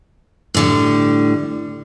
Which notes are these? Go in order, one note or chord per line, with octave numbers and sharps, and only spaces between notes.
A2 D3 G3